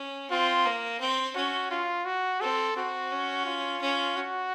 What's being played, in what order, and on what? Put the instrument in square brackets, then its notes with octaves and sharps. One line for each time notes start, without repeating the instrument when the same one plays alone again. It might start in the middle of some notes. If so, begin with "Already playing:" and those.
Already playing: [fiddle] C#4
[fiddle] C4 [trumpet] F4
[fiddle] A#3
C4
[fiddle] C#4 [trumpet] F#4
[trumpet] F4
F#4
[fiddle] C4 [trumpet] A4
[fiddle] C4 [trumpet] F#4
[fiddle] C#4
[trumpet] F4
[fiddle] C#4
[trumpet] F#4